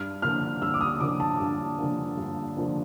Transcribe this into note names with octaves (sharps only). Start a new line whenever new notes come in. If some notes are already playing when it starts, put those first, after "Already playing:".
Already playing: G2 F6
D3 F3 A#3 F6
G2 E6
D6
D#6
D3 F3 A#3 D6
A5
G2
D3 F3 A#3
G2
D3 F3 A#3